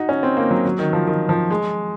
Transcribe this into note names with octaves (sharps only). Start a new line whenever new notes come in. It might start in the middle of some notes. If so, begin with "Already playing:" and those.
Already playing: D#4 F#4
C#4
C4
A#3
F#3
F#3
D#3
F3
D#3
F3
G#3